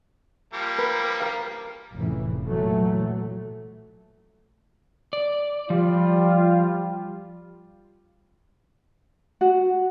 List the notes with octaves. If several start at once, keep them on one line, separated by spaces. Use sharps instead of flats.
F3 G3 A#3
A#4 B4
A#4 F5
F1 A2 C#3 E3
A#2 E3 F#3 A3
D5
F3 G3 F4
F#4